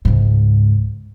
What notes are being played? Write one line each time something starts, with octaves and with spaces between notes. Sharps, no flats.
C#2 G#2